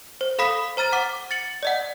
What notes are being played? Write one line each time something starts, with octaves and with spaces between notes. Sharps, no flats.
C5
A4 F5 B5 D#6 B6
C5 A#5 F6 A6 D#7
F#5 D6
A6 C#7 F#7
D5 D#5 F#5